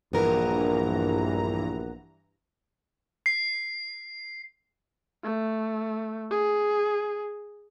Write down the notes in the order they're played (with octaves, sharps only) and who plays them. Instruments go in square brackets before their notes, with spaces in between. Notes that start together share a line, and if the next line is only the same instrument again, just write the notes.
[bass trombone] A#1 [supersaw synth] G2 E3 A#5 [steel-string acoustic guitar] B3 A#4
[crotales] C7
[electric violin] A3
G#4